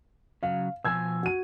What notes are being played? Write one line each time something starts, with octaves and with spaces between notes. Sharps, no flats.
C#3 F#3 F5
B2 F3 G#5 E6 G#6
F#4 D#7